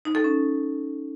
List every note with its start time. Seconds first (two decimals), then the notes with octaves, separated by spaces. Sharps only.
0.05 D#4
0.15 A4
0.24 C#4